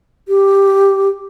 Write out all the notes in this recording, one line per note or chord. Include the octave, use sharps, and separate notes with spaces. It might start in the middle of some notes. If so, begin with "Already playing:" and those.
G4